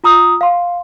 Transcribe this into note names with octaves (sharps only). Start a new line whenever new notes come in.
F4 A#5 D#6 E6
F5 C6